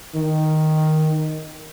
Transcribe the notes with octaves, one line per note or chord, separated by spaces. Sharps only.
D#3